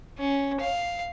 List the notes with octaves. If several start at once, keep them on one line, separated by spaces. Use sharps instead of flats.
C#4
F5